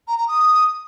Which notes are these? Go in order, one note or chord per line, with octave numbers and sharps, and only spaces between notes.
A#5
A#5
D#6